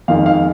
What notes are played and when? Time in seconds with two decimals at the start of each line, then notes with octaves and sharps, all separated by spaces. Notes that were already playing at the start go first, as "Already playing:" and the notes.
0.08 F2 D#3 G#3 F5
0.26 F5